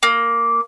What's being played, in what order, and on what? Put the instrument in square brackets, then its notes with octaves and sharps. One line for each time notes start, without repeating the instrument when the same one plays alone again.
[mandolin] A#3